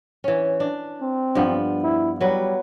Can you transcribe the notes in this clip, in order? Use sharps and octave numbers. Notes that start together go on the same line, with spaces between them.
E3 C#4
D4
C4
G2 F3 B3
E4
F#3 G3 B4